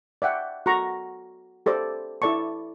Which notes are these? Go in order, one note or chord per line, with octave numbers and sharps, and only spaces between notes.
D5 E5 F#5 G5
F#4 A4 A#5 C#6
G4 A4 C5 D5
E4 A4 D5 A5 C#6